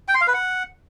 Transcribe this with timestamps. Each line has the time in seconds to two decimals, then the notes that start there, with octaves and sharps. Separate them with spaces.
0.08 G5
0.15 C6
0.21 F5
0.27 B4
0.34 F#5